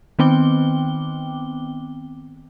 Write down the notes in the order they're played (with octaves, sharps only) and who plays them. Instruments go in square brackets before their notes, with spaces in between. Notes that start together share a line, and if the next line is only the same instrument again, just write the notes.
[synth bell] D#3 B3 C4 G5 D6 G7